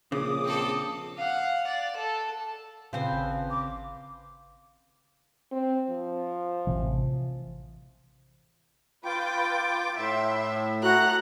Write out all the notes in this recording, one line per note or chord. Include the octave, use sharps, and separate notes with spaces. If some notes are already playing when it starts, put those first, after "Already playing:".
A#1 C#3 D6 D#6
C4 A4
F5 F#5
D5
A4
A#2 C#3 F3 C4 B4 C5
G#1
D6
C4
F3
A1 C3 E3
F4 B4 G5 D6
A2 E5 C6
A3 F#4 A4 F#5 A#5 F#6